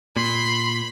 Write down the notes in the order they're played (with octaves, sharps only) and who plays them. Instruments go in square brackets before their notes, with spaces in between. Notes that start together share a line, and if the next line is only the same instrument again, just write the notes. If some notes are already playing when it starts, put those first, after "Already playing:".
[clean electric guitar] A#2 [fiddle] B5 [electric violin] C6